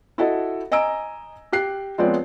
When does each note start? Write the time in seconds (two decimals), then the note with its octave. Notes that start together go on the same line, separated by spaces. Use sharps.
0.18 E4 F#4 A4 D#5
0.72 D#5 G#5 A#5 E6 D7
1.52 G4 F#6 C7
1.98 F3 G#3 B3 C4 C#5 D5